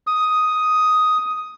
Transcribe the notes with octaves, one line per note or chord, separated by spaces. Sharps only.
D#6